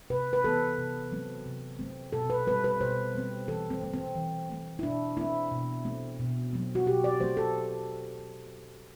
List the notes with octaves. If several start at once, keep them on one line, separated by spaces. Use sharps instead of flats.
C3 B4
B4
E3 B3 A4
C3
F#3 A3 C4
C3
F#3 A3 C4
B2 A4
B4
G3 C4 B4
B4
B2 C5
G3 C4
E3 A4
C4
A3 C4
C4
E3
A3 C4
E4
B2 D4
A3 C4 E4
B2
A3 C4
B2
F#3 A3 C4
F#4
B2 G4
D5
F#3 A3 C4 C5
A4